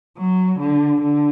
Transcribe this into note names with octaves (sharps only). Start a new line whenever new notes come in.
F#3
D3
D3